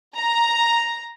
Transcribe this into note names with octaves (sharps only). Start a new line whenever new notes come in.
A#5